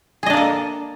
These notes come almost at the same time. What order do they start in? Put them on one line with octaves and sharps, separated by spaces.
G#4 D#5 D4 A#3 A4